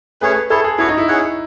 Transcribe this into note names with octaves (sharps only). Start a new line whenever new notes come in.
A3 C#4 G#4 B4 C#5
E4 G#4 A4 C#5
G#4
B3 E4 F#4 C#5
D#4
E4
C#4 G#4 C#5 F#5